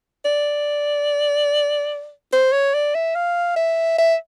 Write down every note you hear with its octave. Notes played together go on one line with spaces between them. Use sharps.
D5
C5
C#5
D5
E5
F5
E5
E5